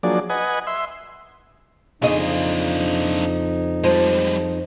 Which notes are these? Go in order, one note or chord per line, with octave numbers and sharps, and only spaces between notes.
F3 F#3 A#3 D4 G#4 D5
B4 D#5 F#5 G#5
E5 C6
F2 C#3 D4 D#4 F4 G#4 D#5
F3 G3 G#3